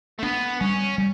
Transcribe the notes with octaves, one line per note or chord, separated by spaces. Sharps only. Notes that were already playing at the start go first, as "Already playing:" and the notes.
A3
B3 D4
G3 C#4
G3